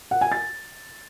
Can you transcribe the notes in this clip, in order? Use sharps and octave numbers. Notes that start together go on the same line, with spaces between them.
F#5
G#5
A6